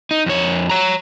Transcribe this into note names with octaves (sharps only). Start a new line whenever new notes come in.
D#4
F2 C#5
C#5 A#5